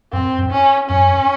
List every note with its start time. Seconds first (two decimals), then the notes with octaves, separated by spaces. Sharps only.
0.12 F#2 C4
0.38 F#2
0.51 C#4
0.89 F#2 C#4